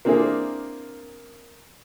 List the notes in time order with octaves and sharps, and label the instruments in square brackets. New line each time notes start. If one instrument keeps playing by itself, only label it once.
[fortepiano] A#3 C4 D4 E4 G#4 A#4